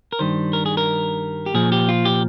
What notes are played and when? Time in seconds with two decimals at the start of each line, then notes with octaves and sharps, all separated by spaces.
0.13 A#4
0.19 G2 D#3 G3 C5
0.53 A#4
0.66 G#4
0.77 A#4
1.46 G4
1.54 A#2 F3 G#4
1.72 G4
1.89 F4
2.05 G4